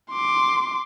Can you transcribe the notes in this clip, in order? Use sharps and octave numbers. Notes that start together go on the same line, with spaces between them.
C6 D6